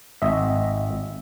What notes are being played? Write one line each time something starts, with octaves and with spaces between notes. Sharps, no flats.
G#1 D#5 E5